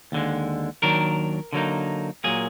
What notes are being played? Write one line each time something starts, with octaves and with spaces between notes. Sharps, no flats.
D#2 D3 G#3
D#2 D#3 F#3 D4 A#4
D3 F#3 A#3 D#4
A#2 F#3 A#3 G#4